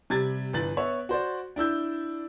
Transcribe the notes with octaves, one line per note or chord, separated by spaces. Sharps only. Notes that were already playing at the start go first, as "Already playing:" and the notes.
C3 G3 G#6 A6
G1 E3 A6 F#7
B3 C#5 E5
F#4 C5 D5
D4 E4 E6 G6